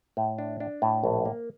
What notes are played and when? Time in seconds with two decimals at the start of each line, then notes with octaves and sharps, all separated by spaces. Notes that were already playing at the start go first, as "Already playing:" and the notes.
0.17 A2
0.38 D4
0.60 D4
0.82 A2
1.04 A#1
1.25 A#3